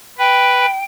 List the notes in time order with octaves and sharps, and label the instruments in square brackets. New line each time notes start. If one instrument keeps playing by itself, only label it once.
[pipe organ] B4 [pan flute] G5